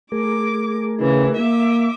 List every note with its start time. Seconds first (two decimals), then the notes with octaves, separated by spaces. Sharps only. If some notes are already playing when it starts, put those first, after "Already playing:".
0.12 A3 G#4 A#4 D6
1.01 C#3 E3
1.37 A#3 E5 D6